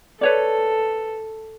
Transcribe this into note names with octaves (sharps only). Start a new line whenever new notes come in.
A4 B4 C#5 D5